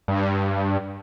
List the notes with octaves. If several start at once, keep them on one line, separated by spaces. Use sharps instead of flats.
G2